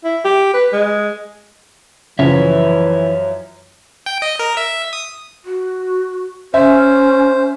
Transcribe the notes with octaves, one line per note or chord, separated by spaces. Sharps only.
E4
G4
B4
G#3
F#2 C#3 E3 F3 C#5 E5
G5
D#5
A#4
E5
D#6
F#4
C#4 C5 E5